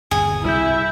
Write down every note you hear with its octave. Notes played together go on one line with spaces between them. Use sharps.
G1 D#2 B2 G#4
C2 E4 E5 E6 G6